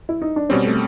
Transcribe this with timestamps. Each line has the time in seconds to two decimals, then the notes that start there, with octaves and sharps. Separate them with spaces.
0.09 E4
0.22 D#4
0.36 D4
0.49 B2 G3 C4 C#4
0.65 A3